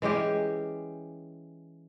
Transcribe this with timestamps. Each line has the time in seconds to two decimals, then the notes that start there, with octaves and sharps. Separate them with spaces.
0.02 E3 G#3 C#4 G4